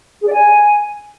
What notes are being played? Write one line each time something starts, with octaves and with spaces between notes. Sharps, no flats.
G#4
D5
G#5